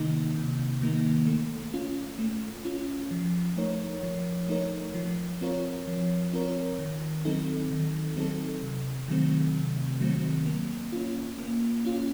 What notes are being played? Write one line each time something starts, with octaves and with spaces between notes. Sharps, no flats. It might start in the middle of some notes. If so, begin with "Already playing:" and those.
Already playing: C3 D#3 A#3 D#4
C3
D#3 A#3 D#4
A3
C#4 F4
A3
C#4 F4
F3
A3 D#4 A#4 C#5
F3
A3 D#4 A#4 C#5
F3
C4 F4 A#4 C#5
F3
C4 F4 A#4 C#5
D#3
F#3 C4 D#4 A4
D#3
F#3 C4 D#4 A4
C3
D#3 F#3 A3 C4
C3
D#3 F#3 A3 C4
A#3
C#4 F4
A#3
C#4 F4